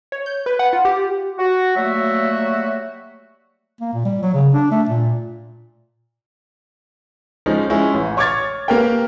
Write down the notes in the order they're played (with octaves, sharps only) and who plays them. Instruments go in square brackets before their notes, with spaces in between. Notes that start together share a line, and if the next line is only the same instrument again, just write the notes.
[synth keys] C#5
G6
B4
F#5
F4
G4
[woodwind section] F#4
F#3 G3 A3 A#3 F#4 E5
[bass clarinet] A#3
A#2
G3
F#3
C#3
D4
A3
A#2
[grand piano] F3 G#3 C#4 D#4
G#3 C#4 E4
A1
C#5 C#6 D6 F6 G#6 A6
A#3 G4 A#4 B4 G5